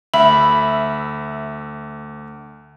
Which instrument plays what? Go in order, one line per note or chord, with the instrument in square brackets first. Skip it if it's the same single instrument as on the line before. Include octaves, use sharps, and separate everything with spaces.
[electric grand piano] D2 [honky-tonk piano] E5 [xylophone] B5